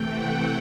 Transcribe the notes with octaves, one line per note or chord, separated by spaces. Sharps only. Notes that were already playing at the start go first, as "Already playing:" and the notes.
Already playing: C3 E3 A3 G5
F#5